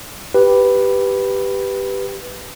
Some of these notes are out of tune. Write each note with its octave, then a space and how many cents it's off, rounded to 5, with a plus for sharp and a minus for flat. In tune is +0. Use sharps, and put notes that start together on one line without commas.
G4 +0 B4 +0